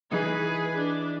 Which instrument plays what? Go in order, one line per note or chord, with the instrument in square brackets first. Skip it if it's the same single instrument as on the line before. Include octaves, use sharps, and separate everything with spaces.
[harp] E3 D#4 [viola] G#4 B4
[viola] D4